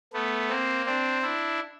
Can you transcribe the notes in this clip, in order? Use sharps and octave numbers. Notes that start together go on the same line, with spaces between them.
A3 B3
A#3 C4
C4 D4
D4 E4